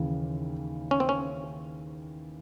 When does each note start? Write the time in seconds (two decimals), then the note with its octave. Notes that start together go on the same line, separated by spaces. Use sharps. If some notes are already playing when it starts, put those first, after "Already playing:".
Already playing: D#2 C#3 E3
0.91 C#4
1.00 C4
1.09 C#4